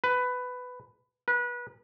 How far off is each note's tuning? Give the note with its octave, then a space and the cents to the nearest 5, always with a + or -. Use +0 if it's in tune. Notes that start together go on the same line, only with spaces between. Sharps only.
B4 +15
B4 -25